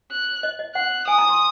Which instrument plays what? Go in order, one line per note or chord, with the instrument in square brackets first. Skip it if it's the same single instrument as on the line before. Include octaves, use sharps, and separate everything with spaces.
[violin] F#6
[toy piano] D#5
D#5
[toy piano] F#5 [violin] F#6
[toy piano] G#5 [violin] D#6
[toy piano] A#5
C6